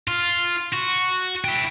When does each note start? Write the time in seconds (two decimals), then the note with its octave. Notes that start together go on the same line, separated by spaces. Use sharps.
0.08 F4
0.73 F#4
1.45 E4 G5